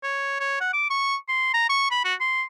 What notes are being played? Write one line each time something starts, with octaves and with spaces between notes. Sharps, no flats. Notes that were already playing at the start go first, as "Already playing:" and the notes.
C#5
C#5
F#5
D6
C#6
C6
A#5
C#6
B5
F#4
C6